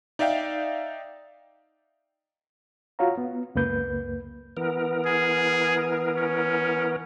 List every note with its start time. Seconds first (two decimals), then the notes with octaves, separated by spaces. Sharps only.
0.19 D#4 D5 E5 F5 G5
2.99 F4 F#4 C#5 F5 A#5
3.18 B3
3.55 C#2 F#2 A#3 B4 G6
4.57 E3 B3 A#4
5.06 G#4
6.17 C#4